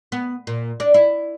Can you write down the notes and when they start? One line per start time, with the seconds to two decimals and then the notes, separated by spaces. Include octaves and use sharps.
0.12 B3
0.47 A#2
0.80 D4
0.94 E4